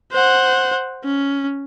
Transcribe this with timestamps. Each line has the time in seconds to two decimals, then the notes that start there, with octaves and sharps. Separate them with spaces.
0.12 C5 F#5
1.04 C#4